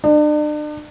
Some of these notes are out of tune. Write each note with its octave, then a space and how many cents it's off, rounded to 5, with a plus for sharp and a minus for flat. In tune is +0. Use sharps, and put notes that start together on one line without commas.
D4 +40